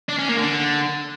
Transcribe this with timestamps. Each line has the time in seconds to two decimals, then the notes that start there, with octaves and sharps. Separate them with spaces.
0.09 D4
0.18 C#4
0.28 A#3
0.38 D3